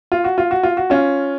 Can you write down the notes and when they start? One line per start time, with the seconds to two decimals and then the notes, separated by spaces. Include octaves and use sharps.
0.12 F4
0.24 F#4
0.38 F4
0.51 F#4
0.63 F4
0.77 F#4
0.90 C#4 F4